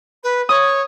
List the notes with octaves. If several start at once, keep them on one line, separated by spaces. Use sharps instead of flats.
B4
C#5 D#6